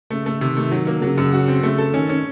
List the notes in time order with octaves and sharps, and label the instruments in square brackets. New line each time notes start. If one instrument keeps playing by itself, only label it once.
[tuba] C#3 [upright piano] A3
[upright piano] A3
[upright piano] C3 [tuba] D#3
[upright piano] A3
F#3
A#3
[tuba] C#3 [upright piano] F#3
[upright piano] F#2
F#4
C4
[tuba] C#3 [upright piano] A3
[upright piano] A4
[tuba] D#3 [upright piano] C#4
[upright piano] C#4